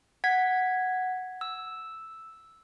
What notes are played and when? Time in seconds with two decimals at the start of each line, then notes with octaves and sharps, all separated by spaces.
0.24 F#5 G#6 B6
1.41 E6